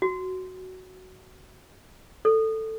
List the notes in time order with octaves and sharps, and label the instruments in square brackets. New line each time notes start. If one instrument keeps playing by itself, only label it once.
[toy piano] F#4
A4